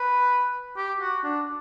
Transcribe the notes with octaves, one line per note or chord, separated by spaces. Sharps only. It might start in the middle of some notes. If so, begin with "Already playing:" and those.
Already playing: B4
G4
F#4
D4